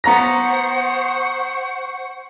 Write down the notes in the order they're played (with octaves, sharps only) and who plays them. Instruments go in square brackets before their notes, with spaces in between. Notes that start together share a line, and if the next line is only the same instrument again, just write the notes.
[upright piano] B3 A#5 A#6 [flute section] C5 F#5 C#6